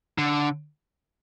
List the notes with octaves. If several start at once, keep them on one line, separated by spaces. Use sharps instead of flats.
D3